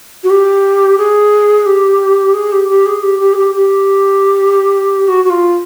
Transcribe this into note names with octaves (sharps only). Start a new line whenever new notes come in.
F#4
G4
G#4
G4
G#4
G4
G4
G#4
G4
G4
G#4
G4
G4
F#4
F#4
F4